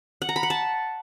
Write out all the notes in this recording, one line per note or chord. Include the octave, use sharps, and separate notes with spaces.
F#5
A#5
B5
F#5
A5